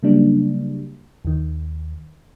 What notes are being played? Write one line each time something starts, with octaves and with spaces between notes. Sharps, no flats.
C#3 F#3 G3 A#3 D4
D#2 D#3